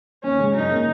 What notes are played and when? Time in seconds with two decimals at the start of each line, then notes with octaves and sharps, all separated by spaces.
0.23 D#2 C#4
0.39 C#3 G#3
0.54 F#2 D#4
0.71 C#3 A#3